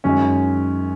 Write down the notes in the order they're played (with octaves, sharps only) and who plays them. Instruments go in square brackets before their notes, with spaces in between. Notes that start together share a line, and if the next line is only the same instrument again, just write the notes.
[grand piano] F#2 D#3 G#3 [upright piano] C#4